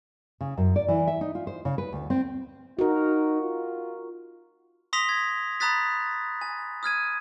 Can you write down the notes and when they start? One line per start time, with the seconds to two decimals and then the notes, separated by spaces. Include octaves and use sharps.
0.41 C#3
0.57 F#2
0.76 D5
0.88 E3
1.07 E5
1.21 D#4
1.35 F4
1.47 C5
1.65 C#3
1.78 B4
1.93 D2
2.10 C4
2.79 D#4 F#4 A#4
3.42 F4
4.93 C6 D#6 A#6 B6 F7
5.09 G#6
5.60 A#5 B5 D#6 F#6 A6 B6
6.41 G#5
6.83 D#6 F6 G#6 D#7